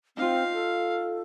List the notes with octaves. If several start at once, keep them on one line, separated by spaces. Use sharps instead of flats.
C4 D#4 F4 F5
A4